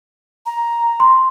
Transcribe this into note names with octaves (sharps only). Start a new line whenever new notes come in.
A#5
C6